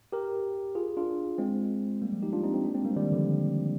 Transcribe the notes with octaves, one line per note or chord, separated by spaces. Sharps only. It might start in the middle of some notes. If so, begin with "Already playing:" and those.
G4 A#4
F4 G#4
D4 F4
G#3 C4
G3 A#3
F3 G#3
D#4 G4
D4 F4
C4 D#4
C4 D#4
A#3 D4
G#3 C4
G3 A#3
D#3 G3
D3 F3